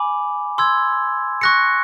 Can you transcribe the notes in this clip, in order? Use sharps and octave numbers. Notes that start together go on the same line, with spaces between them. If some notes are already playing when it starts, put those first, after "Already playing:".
Already playing: G#5 B5 D6
C6 E6 G#6
C#6 F#6 A#6 C#7